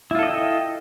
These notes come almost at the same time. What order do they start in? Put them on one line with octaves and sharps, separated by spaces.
E4 F4 A4 D#5 G5